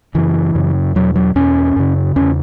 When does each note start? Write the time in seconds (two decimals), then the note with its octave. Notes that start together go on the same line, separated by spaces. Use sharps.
0.15 F#2 C#3 E3
0.55 F#2 C#3
0.95 E2 B2 F#3
1.16 F#3
1.35 E2 B2 C#4
1.76 F#2 C#3
2.16 E2 C#3 C#4